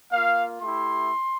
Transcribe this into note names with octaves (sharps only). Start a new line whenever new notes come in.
A#3 F4 F5
A3 E4 G4 C6